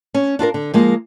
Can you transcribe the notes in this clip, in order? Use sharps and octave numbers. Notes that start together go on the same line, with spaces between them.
C#4
D4 F4 G#4 A#4
D3
F3 G#3 A#3